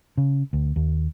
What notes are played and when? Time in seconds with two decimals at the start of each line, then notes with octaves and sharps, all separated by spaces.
0.17 C#3
0.53 D2
0.76 D#2